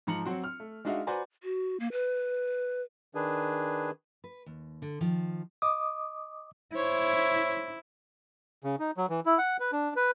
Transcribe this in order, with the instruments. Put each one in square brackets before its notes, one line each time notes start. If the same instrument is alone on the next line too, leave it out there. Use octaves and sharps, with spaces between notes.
[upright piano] G#2 F3 A#5 C#7 F#7
F#3 C4 F#4
F6
A3
G#3 D4 D#4 F#4 E5 F5
F#4 B4 C5 D5 G#5 A#5
[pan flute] F#4
A#3
B4
[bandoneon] D#3 D4 G#4 B4
[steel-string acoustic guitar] B4
D#2
D3
D#3 F3
[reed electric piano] D#5 D6 D#6
[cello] E4 [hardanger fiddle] C5 C#5
[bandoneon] C#3
D#4
F#3
E3
E4
F#5
B4
D4
B4